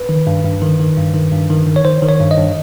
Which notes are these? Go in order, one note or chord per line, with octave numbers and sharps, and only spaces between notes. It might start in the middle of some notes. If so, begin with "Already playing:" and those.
Already playing: B4
D#3
G2
G2
D#3
D#3
G2
D#3
G2
D#3
D#3
C#5
D#3 C5
D#3
C#5
G2
D#5
G2